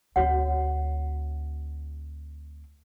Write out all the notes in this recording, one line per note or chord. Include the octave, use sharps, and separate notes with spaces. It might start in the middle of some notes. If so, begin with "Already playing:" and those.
D2 C4 F#4 C#5 F#5